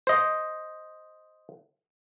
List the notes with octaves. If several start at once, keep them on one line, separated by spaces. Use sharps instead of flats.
C5 D#5